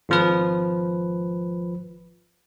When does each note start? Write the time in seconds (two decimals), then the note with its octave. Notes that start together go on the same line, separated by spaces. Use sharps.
0.09 G#1 F3 B4